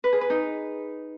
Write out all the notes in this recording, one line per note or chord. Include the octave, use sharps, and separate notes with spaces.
B4
G#4
B4
D#4